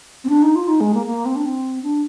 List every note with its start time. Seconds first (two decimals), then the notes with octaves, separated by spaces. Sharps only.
0.24 C4
0.29 D4
0.42 D#4
0.55 F4
0.68 D#4
0.80 G#3
0.94 A#3
1.06 A#3
1.25 C4
1.36 D4
1.45 C4
1.83 D4